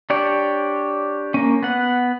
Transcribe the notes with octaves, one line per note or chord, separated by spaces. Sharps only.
D4 G4 C#5 D5
A#3 C#4
B3 F#5